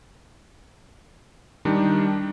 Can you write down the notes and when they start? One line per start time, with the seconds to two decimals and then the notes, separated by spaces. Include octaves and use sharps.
1.65 D#3 G3 D4 D#4